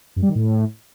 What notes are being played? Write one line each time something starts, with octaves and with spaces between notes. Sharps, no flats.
F#2
G3
D#3
A2